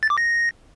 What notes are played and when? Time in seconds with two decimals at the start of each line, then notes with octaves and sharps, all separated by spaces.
0.03 A6
0.10 D6
0.18 A#6